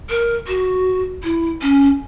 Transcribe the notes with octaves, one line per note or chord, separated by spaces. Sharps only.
A#4
F#4
E4
C#4